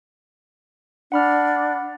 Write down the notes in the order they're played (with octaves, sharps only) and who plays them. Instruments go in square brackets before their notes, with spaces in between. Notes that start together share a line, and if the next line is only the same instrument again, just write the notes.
[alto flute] D4 [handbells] F#5 B5 F6